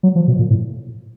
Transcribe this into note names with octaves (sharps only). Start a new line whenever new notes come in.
F#3
F3
B2
A#2
A2